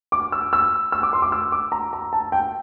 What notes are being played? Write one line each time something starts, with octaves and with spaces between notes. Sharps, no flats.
D6
E6
E6
E6
D6
C6
D6
E6
D6
A#5
A#5
A5
G5